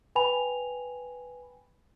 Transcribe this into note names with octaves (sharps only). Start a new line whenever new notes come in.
B4 G5 G#5 B5 F7